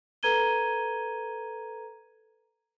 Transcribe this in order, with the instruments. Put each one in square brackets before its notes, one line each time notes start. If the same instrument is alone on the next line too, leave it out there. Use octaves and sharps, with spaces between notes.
[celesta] A4 B4 A#5 G#6 D#7 G7